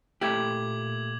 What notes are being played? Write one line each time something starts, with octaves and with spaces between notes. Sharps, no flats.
A#2 A3 E4 G4 D6 G#6 F#7